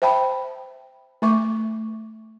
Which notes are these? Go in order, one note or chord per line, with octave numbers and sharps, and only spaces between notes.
C5 E5 G5 A5 B5
A3 E5 C#6 D6